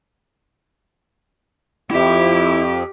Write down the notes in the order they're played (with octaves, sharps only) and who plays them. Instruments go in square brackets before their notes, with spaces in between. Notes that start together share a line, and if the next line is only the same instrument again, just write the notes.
[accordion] F2 [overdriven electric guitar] E4 E5 [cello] G4